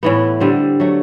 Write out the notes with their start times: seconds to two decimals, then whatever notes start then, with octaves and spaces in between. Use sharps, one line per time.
0.03 A2 E3 B3
0.40 D3 G3 C4
0.80 F#3 A3